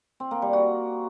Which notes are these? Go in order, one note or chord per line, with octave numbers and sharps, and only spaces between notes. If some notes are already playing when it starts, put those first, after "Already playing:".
C4
A#3
G3
F#4